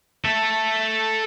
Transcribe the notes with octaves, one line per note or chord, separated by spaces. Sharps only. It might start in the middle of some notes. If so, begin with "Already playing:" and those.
A4 E5